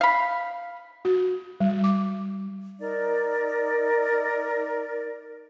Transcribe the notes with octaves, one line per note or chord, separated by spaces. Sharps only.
F5 B5
F#4
G3
D6
D#4 A#4 D5